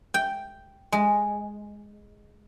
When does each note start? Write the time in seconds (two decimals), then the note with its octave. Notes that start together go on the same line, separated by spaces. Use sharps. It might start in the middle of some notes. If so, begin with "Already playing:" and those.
0.14 G5
0.92 G#3